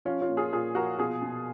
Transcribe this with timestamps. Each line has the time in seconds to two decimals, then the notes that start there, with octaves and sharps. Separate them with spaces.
0.05 F3 C#4 F4
0.21 C#4 F4
0.29 A#2
0.37 F4 G#4
0.52 A#2 F4 G#4
0.75 F3 F#4 A#4
0.98 B2 F4 G#4
1.22 B2